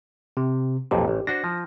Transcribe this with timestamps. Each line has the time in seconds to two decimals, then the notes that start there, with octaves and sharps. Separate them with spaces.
0.37 C3
0.91 B1 F2 A#2 G4
1.08 A1
1.27 D4 F#4 C5 A#6
1.44 F3